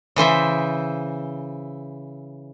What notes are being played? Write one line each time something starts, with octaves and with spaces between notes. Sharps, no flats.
C#3 E3 C5 E5